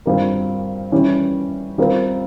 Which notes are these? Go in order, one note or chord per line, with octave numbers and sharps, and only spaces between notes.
G2 G3 C4 F4 A#4
E3 G3 C#4
G3 C4 F4 A#4